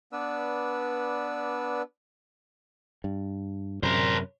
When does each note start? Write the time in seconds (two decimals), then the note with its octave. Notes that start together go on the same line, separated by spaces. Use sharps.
0.12 B3 D4 B4 D5 E6
3.04 G2
3.83 F#2 C3 A#4 C5